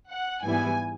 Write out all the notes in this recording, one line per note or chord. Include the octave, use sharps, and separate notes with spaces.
F#5
G#2 E3 G3 B3 E4 G#5